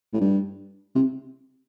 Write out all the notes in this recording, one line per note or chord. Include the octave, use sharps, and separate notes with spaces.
A2
G2
C3